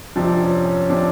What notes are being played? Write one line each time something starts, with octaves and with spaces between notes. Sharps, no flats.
F2 C3 F3 D4
C#4
C#4
C3 F3 D4